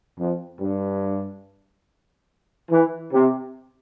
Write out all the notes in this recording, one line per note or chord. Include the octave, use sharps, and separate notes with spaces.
F2
G2
E3
C3